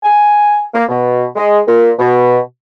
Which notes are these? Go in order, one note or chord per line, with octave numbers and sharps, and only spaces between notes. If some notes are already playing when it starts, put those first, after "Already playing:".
G#5
A#3
B2
G#3
A#2
B2